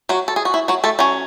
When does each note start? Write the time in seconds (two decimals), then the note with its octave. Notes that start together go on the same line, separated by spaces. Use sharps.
0.09 F#3 F#4
0.28 A4
0.36 G#4
0.45 F#4
0.54 E4
0.68 F#3 F#4
0.84 A3 A4
0.99 F#3 C#4